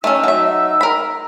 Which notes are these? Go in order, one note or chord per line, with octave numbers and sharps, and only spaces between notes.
A3 C#4 D#4 E6
F#3 E5
A#4 B5